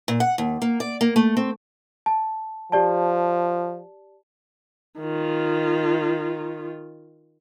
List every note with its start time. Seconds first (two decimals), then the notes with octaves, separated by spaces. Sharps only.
0.08 A#2
0.20 F#5
0.38 D#2
0.62 A#3
0.80 D5
1.01 A#3
1.16 A3
1.37 C4
2.06 A5
2.72 F3 G4 D5 A5
5.00 D#3 F4